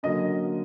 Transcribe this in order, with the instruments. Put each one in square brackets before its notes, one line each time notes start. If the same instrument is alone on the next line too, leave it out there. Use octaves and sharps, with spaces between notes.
[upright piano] D3 F#3 A#3 C#4 D#5